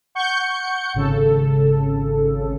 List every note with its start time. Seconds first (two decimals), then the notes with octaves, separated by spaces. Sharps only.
0.15 F#5 C#6 G6 C#7
0.94 G#1 C#3 A4